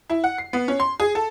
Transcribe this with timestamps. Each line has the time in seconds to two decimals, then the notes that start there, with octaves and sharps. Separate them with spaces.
0.10 E4
0.24 F#5
0.38 C7
0.53 B3
0.68 C#4
0.80 C6
1.00 G#4
1.15 A4